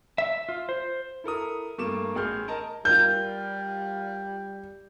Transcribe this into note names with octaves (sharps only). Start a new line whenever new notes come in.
E5
F4
C5
E4 A4 A#4 D#6
G2 A3 A#3 D6 E7
A1 G#4 F6 G6
A#4 D#5 A5
G3 F4 A#4 G6